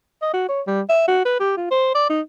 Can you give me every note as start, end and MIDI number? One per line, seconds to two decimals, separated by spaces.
0.22 0.33 75
0.33 0.48 66
0.49 0.62 73
0.67 0.81 55
0.89 1.03 76
1.08 1.25 66
1.25 1.37 71
1.40 1.52 67
1.57 1.66 65
1.71 1.93 72
1.95 2.10 74
2.10 2.21 63